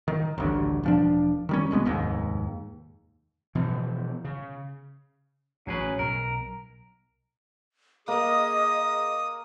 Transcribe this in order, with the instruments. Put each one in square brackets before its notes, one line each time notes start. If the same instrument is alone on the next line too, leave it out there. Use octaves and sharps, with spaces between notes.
[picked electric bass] D#3
A1 D2 G2
E1 F3 D4
D#3 G3 C#4
B1 B2 G#3 B3
F1 D#2 G#2
[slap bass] B2 E3 F3
C#3
[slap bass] A1 [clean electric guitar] F#3 G#4 B4 [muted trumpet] C#4
[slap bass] B1 [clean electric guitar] A#4 [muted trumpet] A#5
[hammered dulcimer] A#3 [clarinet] G#4 [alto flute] D#5 [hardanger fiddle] D#6